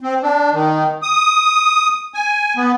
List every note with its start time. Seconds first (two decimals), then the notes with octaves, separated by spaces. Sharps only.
0.01 C4
0.22 D4
0.53 D#3
1.02 D#6
2.14 G#5
2.57 B3